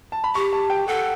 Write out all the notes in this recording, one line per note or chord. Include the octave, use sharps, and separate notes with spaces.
A5
B5
G4 C#6
A5
G5
A4 F#5